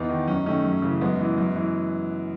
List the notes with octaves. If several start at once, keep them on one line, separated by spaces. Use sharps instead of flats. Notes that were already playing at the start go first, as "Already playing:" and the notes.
Already playing: E2 B3 D#4
D#3
F#2 C#4
D#4
D#3 A3 C#4
F#2
C#3 E3
F#2 G#3 B3
E3
F#2
E3